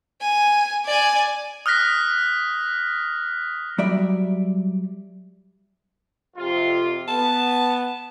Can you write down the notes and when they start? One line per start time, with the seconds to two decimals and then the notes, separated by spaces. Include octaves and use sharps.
0.21 G#5
0.86 D5 G#5
1.66 D#6 F6 F#6 A#6 B6
3.78 F#3 G3 D5 E5
6.37 F2 C3 F4
7.08 B3 A5